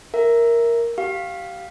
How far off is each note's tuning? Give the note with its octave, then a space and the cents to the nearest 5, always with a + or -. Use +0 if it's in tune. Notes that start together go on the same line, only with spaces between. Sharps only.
A#4 +0 E5 +0
G4 -30 F5 +0